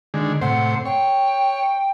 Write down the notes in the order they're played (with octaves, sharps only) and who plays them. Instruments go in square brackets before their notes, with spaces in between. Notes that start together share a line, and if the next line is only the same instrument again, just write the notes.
[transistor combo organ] D3 D#3 G#3
[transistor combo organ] A2 C3 C5 [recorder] F#5
[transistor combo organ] C#5 [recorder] G5